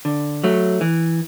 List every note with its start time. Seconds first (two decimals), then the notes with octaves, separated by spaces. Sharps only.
0.05 D3
0.44 F#3 A3
0.81 E3